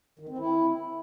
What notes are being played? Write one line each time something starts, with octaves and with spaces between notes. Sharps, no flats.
D#3
C4
E4